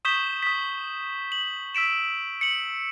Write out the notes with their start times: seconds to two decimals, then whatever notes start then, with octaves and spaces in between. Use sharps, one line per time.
0.05 C#6 D#6 G6 B6 E7 G7
0.43 D#6 B6
1.32 F#7
1.75 E6 B6 D7 E7
2.41 C#7 F#7